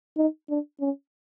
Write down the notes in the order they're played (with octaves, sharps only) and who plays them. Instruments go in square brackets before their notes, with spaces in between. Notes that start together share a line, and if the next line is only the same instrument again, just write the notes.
[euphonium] D#4
D4
C#4